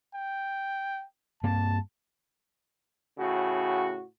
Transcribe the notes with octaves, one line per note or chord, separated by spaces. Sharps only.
G5
G2 A#3 C4 A5
A2 C#3 F#4